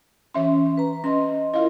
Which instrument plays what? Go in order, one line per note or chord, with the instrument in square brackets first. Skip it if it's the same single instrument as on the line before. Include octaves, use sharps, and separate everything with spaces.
[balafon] E3 E5 C6 [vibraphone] C#4
[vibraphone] B4 A#5
[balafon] C#4 [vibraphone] D#5 C6
[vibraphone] E4 F4 A#4 [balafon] D#5 F5